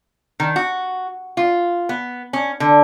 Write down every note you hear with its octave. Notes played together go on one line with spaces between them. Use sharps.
D#3
F#4
F4
B3
C#4
D3